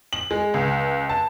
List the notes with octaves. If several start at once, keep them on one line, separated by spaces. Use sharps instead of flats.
F#7
G#3
C#2
A5